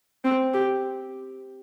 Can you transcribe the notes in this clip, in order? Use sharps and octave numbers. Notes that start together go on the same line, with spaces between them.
C4
G4